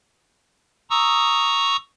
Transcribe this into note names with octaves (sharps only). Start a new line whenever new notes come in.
A#5 C#6 D#6 E6